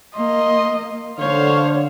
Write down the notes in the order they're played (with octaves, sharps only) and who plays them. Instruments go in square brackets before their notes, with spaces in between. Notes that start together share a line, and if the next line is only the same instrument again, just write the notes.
[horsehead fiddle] A#3 [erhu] D#5 [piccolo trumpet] C6
[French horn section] D3 [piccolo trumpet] C5 [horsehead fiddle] C#5 [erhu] F5